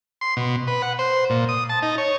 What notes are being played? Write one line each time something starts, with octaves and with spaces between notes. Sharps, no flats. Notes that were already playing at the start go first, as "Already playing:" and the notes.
C6
B2
B4
F#5
C5
A#2
D#6
A5
D#4
C#5